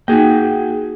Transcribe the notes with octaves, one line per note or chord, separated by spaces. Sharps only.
A#3 D#4 F#4 G#4 G5